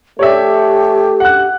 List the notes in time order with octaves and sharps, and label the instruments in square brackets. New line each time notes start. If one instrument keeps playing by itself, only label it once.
[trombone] A3 [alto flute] G4 [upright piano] C#5 D5 E5
[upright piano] F#5 F#6